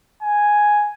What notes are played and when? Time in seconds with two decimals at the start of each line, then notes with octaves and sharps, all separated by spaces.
0.23 G#5